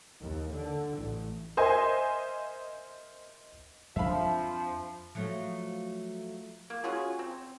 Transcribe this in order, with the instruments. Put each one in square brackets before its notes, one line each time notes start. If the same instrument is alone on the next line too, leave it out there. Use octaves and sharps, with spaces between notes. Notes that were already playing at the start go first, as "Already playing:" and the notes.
[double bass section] D#2
D3
A1
[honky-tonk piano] A#4 C5 D#5 E5 G#5
[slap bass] F2 A#3 D4 [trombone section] F3 [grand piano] E5 F5 B5
[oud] F3 F#3 A3
[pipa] A#3
C#4 F4 F#4 G#4
C4